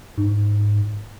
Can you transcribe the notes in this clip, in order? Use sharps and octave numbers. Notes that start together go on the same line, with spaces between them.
G#2